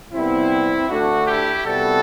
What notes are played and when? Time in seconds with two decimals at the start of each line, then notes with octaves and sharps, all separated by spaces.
0.13 C2 C3 G3 B3 C4 E4
0.89 D2 D3 A3 D4 F#4
1.27 E4 G4
1.65 C2 C3 G3 B3 F#4 A4